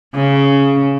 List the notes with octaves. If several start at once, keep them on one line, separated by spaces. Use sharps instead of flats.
C#3